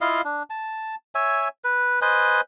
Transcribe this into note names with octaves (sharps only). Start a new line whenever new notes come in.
E4 F4 D#5 F5
D4
A5
C#5 E5 G#5
B4
B4 C5 D#5 G#5